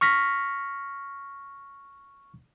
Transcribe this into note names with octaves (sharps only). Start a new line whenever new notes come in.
C#6 F6 A#6 B6